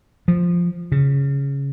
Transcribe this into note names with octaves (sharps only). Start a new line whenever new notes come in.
F3
C#3